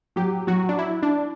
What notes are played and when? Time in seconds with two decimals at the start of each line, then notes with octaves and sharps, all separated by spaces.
0.16 F#3 G4
0.47 F#3 F#4
0.69 D4
0.79 E4
1.03 D4